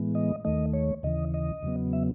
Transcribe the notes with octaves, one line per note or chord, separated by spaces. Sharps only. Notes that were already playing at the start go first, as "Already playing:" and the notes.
Already playing: A2 E3 G#3 B3
D#5
D#2 D#3 A3 D#5
C#5
D#2 C#3 E3 D#5
D#5
E2 C#3 F#3 B3
E5